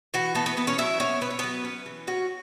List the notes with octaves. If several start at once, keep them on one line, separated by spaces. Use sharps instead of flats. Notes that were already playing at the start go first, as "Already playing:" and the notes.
E3 F#4
A3 B3 A4
B3 B4
E3 B3 B4
C#4 C#5
F#3 E4 E5
B3 C#4 C#5
B3 B4
C#5
F#3 B3 B4
C#4
E3
C#4 F#4